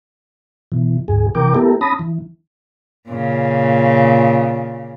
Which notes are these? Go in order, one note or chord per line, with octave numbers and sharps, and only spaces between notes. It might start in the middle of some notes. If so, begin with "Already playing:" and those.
B2 E3
D2 G#2 G#4
C3 E3 A#4 G5 D6
A3 B3 E4 G4 A4 A#4
C#4 A5 B5 D#6 A#6
E3
A#2 C#3